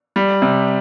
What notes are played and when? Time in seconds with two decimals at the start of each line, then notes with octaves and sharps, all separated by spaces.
0.16 G3
0.42 C3